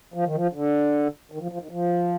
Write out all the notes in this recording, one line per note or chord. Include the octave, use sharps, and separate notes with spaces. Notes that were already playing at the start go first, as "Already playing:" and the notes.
F3
D#3
F3
D3
D#3
F3
F3
D#3
F3